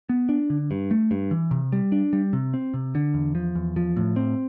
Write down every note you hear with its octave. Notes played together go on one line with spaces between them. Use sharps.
B3
D4
D3
G2
A3
G2
E3
C3
G3
D4
G3
C3
C4
C3
D3
E2
F3
E2
F3
A2
C4